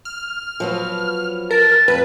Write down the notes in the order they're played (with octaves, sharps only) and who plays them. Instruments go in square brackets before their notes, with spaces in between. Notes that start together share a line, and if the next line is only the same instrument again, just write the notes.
[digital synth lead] F6
[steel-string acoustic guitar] F3 F#3 B3
[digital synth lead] A#4 [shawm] A5
[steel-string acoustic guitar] F2 [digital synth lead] B4